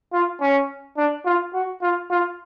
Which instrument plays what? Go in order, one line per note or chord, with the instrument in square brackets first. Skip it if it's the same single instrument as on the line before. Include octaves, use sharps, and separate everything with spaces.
[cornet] F4
C#4
D4
F4
F#4
F4
F4